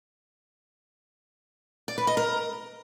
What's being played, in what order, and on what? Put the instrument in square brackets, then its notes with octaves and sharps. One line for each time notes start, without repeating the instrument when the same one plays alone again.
[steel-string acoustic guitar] D5
B4
D#5
A#4